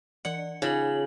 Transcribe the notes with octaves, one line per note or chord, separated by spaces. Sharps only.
E3 D5 F#5 C#7
C#3 D#4 F4 F#7